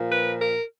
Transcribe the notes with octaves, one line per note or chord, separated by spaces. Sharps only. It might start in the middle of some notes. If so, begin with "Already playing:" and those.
Already playing: A#2 F3
B4
A#4